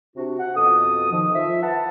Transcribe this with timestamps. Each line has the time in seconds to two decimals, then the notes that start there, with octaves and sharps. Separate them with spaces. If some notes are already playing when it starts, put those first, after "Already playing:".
0.16 C3 D4 F#4
0.39 F#5
0.56 F2 B2 A4 D#6
1.12 D#3 F3
1.35 F3 F4 E5
1.63 B4 E5 F#5 A5